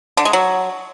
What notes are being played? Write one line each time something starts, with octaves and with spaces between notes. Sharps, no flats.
D3
G#3
F#3